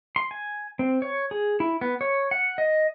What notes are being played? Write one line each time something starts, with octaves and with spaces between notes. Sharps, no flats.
C6
G#5
C4
C#5
G#4
E4
B3
C#5
F#5
D#5